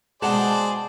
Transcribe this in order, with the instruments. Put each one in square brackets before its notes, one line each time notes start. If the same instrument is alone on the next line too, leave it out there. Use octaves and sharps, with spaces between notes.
[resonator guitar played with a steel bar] B2 G5 A5 [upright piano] G#3 F#5 [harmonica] G#4 C5 D5